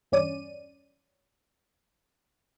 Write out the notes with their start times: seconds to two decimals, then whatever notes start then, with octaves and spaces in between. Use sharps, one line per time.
0.12 E2 G2 C#4 D5 D#7